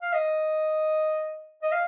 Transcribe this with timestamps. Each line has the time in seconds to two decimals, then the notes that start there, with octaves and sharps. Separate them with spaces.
0.02 F5
0.13 D#5
1.62 D#5
1.72 F5